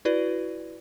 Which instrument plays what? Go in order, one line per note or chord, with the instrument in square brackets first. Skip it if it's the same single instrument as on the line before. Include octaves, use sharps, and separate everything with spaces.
[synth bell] E4 F#4 B4 D5